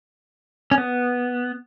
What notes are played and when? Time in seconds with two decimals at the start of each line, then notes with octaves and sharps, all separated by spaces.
0.71 C#4
0.78 B3